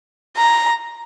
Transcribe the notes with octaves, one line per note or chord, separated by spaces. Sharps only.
A#5